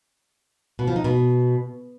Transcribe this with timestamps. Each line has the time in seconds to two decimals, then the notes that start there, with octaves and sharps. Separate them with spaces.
0.79 B2
0.87 F3
0.96 D#4
1.04 B2